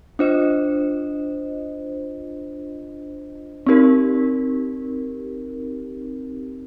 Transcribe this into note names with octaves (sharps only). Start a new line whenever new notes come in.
D4 F4 C5 D#5
C4 D#4 G4 A#4